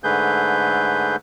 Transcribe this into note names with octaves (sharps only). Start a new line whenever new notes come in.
G#2 D3 A3 G#4 B4 G6